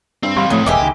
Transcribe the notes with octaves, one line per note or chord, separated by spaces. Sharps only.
G2 C4
E3 G3 C4 F5 B5 C6
A2 F3 F#3 A3 D#6
E1 E3 G#3 A#3 G4 D6 E6
C#2 D#3